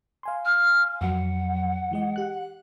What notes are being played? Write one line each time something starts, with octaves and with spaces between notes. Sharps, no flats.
F5 G#5 C6
F6
F2 F#3 F#5
E3 G#3 D#5
G4 F#6